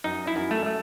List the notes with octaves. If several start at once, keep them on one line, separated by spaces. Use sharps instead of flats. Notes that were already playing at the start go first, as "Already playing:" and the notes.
F#2 D#4
E4
F#2
A3
A3